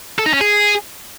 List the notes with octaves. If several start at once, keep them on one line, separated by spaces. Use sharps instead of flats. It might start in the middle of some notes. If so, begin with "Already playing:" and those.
A4
D#4
C#4
G#4